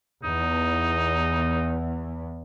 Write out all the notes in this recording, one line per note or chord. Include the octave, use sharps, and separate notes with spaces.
E2 D#4